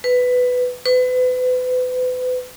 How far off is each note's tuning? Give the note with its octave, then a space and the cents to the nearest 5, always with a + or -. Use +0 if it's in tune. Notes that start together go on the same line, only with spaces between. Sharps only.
B4 +10
B4 +35